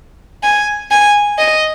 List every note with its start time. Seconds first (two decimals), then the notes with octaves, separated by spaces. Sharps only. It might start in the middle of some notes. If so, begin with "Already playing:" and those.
0.43 G#5
0.91 G#5
1.39 D#5